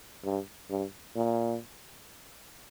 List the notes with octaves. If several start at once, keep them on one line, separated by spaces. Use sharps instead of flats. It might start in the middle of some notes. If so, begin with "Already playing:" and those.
G2
G2
A#2